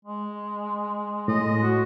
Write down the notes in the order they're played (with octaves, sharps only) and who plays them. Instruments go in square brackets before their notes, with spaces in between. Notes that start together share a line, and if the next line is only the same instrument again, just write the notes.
[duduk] G#3
[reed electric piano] A2 [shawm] D#5
[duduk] F#4